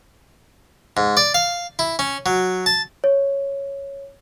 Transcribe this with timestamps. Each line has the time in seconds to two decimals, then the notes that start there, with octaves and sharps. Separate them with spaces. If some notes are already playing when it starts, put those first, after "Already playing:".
0.97 G#2
1.17 D5
1.34 F5
1.79 E4
1.99 C#4
2.26 F#3
2.66 A5
3.04 C#5